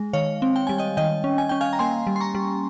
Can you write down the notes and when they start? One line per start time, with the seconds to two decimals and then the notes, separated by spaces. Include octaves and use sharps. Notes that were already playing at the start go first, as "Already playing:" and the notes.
Already playing: G#3
0.13 D#3 C#5 F5
0.42 C4
0.56 G5
0.67 G3 G#5
0.78 D#5 G5
0.97 D#3 D#5 G5
1.24 C#4
1.38 G#5
1.49 C#4 G5
1.61 F5 G#5
1.73 A#5
1.79 A#3 G#5 C6
2.07 G3
2.16 C6
2.20 A#5 C#6
2.35 G3